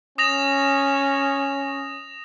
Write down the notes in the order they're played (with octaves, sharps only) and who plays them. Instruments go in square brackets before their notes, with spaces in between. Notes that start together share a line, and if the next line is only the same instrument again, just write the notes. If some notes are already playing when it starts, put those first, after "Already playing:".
[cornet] C#4 [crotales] D#6 A#6 F7